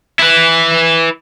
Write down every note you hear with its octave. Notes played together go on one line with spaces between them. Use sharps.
E4 B4